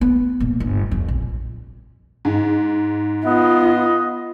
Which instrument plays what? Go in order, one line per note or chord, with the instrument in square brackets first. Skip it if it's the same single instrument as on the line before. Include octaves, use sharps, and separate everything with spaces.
[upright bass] B3
A#2
G1
F2
A#1
[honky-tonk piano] G#2
[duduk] B3 [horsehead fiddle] F4 [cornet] D#5